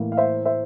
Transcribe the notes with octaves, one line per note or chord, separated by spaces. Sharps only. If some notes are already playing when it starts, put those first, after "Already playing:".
Already playing: A2 E3 A#3
F5
C5 E5
C5 E5